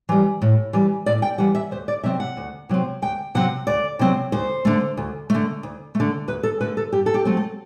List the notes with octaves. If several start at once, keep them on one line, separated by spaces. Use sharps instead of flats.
E3 G3
A2
E3 G3
A2 D5
G5
E3 G3 F#5
E5
D2 C5
D5
C3 F#3 C4 E5
F#5
D2
C3 F#3 C4
D2 G5
C3 F#3 C4 F#5
D2 D5
C3 F#3 C4
D2 C5
D3 A3
D2
D3 A3
D2
A3
D3
D2 B4
A4
D3 A3 B4
A4
G2 G4
A4
G4
F#3 A3 C4
A4